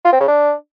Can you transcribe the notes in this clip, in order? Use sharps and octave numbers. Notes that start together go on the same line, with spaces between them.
F4
C4
C#3
D4